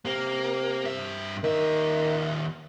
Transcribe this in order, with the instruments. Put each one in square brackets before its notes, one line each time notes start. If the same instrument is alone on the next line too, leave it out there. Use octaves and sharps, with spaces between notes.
[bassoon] C3 [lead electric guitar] A#3
[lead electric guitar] G2 E5
[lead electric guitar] D#2 E5 [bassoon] D#3